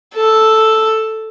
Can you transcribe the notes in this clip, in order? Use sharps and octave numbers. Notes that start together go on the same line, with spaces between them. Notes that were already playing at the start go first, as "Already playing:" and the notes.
A4